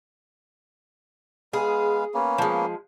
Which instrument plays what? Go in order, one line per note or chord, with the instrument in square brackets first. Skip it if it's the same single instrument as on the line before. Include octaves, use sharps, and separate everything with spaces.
[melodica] G#3 B3 F5 [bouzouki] G#4
[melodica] A#3 B3 C#4
[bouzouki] F3 G#3